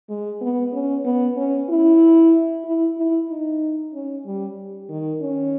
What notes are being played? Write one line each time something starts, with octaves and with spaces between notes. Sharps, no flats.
G#3
B3
C#4
B3
C#4
E4
E4
E4
D#4
C#4
G3
D#3
C#4